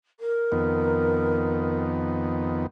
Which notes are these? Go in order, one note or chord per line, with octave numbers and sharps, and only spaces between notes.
A#4
F2 D#3 B3